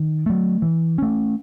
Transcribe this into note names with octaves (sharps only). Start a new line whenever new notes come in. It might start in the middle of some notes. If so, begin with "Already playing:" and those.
Already playing: D#3
F#3 A3
E3
A3 C#4